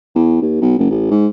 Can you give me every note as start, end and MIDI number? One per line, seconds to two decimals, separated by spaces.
0.15 0.39 40
0.41 0.57 39
0.61 0.75 35
0.78 0.89 30
0.91 1.07 33
1.11 1.27 44